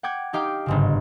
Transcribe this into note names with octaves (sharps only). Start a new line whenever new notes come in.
F#5 G5 D6 G#6
D#4 G4 F5 G5 D6
G1 G#2 C#3